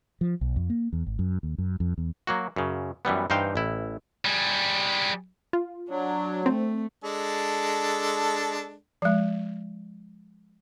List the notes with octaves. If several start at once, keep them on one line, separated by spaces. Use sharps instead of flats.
F3
B1
F2
A#3
E2
G#1
F#2
D#2
F#2
F2
E2
F#3 A#3 F#4
F#2 C#3
F#2 E3 G3 B3
G2 E3 D#4 C5 F5 G5
A1 E4
G3 G#4
F4
F#3 D4
A3 C4
G#3 D4 A4
F3 G#3